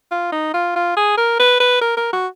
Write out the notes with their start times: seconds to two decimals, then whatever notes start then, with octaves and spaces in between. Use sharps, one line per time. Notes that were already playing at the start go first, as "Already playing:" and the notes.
0.11 F4
0.32 D#4
0.54 F4
0.76 F4
0.97 G#4
1.17 A#4
1.39 B4
1.60 B4
1.81 A#4
1.97 A#4
2.13 F#4